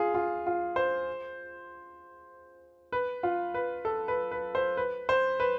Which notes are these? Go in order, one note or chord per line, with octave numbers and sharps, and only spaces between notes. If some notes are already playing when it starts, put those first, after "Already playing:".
Already playing: F4 G#4
F4
F4
C5
B4
F4
B4
A4
B4
B4
C5
B4
C5
B4